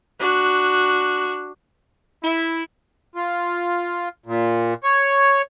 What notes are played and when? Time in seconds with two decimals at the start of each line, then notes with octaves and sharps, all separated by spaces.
0.19 D4 F#4
2.23 E4
3.15 F4
4.26 A#2
4.84 C#5